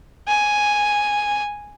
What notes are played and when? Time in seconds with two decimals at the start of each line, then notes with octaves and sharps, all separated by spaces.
0.28 G#5